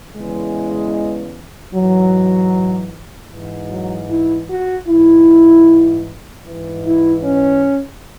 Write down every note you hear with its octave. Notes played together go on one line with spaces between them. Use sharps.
E2 C#3 E3 G#3
G#2 E3 F#3
G#2 E3
F#3
E4
F#4
G#2 E3 E4
G#2 E3
E4
C#4